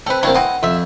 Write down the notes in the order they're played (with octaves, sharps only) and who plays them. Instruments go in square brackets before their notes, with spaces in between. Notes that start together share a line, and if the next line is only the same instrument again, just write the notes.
[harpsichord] C4 [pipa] A4 B4
[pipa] F#3 A3 E4 [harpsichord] A#3 C4 D4
[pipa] E3 C4 E4 [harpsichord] D#5 F#5
[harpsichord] F2 [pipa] F4 E5